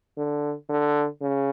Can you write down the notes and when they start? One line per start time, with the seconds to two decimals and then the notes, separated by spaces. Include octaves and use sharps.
0.17 D3
0.69 D3
1.22 C#3